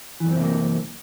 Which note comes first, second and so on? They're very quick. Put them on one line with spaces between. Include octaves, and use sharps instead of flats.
E3 F#2 C4 C3 A#3